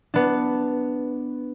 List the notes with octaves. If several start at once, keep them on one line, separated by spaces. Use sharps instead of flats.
B3 D4